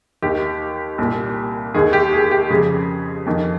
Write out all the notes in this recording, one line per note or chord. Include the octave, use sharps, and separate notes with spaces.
D#2 D#3 G4
C2 A#2
D#2 D#3 G#4
G4
G#4
G4
F2 C#3 G#4
F2 D#3